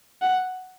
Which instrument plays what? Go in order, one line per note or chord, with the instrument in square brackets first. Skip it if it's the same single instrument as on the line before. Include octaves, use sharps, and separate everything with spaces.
[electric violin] F#5